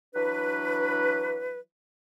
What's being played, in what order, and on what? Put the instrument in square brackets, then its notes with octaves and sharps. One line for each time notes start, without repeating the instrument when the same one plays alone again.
[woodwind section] E3 F#3 D4 B4